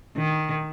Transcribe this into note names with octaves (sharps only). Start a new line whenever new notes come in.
D#3